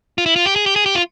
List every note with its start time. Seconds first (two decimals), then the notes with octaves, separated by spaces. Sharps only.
0.18 F4
0.26 E4
0.36 F4
0.46 G4
0.56 G#4
0.66 G4
0.76 G#4
0.86 G4
0.95 F4